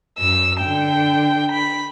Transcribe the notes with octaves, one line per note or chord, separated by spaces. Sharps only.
F#2 E6
D3 G5
B5